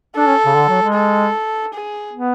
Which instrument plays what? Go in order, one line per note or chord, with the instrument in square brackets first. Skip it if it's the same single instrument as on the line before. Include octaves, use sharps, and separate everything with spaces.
[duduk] D4 [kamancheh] A4
[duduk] C#4
C#3
D3
F#3
G#3
[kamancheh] A4
G#4
[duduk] B3